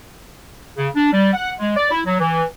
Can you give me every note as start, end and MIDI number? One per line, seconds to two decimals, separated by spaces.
0.77 0.89 49
0.96 1.08 62
1.13 1.31 55
1.34 1.51 78
1.60 1.75 56
1.77 1.89 74
1.91 2.00 64
2.06 2.16 54
2.20 2.44 52